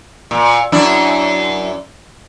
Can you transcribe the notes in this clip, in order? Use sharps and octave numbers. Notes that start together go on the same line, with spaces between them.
A#2
F#2 D4 E4